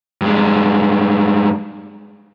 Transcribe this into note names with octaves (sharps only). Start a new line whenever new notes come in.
G2 G#3